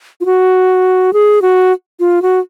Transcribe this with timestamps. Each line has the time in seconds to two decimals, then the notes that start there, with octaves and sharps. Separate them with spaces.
0.21 F4
0.25 F#4
1.13 G#4
1.42 F#4
2.00 F4
2.22 F#4